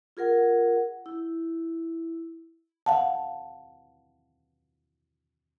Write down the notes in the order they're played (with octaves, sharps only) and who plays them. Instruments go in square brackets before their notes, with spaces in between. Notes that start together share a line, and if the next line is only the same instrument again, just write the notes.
[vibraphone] F4 G#4 A#4 F#5
E4
[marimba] F5 F#5 A5